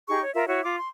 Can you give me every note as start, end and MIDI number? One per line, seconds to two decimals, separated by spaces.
0.09 0.21 63
0.09 0.21 67
0.09 0.21 68
0.09 0.21 85
0.21 0.32 73
0.35 0.47 65
0.35 0.47 70
0.35 0.47 76
0.47 0.61 64
0.47 0.61 66
0.47 0.61 73
0.62 0.76 65
0.62 0.76 86
0.78 0.88 84